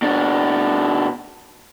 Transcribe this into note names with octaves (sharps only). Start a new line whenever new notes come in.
B2 D4